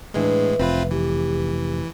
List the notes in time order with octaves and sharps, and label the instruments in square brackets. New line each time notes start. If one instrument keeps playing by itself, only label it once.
[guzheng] E2 E3 [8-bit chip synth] A2 G#3 [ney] D4
[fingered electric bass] F1 [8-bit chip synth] C4 F4 B4 [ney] E5 [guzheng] B5
[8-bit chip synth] E3 [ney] G4